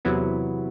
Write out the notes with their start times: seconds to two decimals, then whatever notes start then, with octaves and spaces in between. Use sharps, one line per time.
0.05 E2 C3 F#3 B3 E4